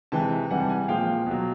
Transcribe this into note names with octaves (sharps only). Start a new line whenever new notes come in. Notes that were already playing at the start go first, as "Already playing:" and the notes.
C3 E3 G#3 G5 A5
C3 E3 G3 F#5 G#5
G5 A5
F#5 G#5
A#2 F3 G#3 F5 G5
B2 F#3